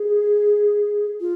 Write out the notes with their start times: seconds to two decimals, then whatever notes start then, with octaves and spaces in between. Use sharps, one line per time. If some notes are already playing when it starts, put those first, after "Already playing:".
Already playing: G#4
1.21 F4